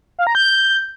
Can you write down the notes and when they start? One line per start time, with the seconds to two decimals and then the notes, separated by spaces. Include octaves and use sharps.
0.19 F5
0.27 A#5
0.35 G6